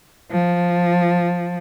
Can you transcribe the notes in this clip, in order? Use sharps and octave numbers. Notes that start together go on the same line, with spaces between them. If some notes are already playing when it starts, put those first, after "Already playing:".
F3